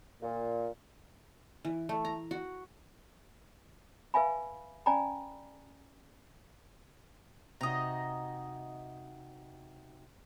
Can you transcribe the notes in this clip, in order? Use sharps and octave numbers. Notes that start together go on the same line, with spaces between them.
A#2
E3
A3
A#5
F#4
B4 E5 F5 G#5 B5
C#4 D5 G5 G#5 A#5 B5
C3 D#4 F#4 D#5 A#5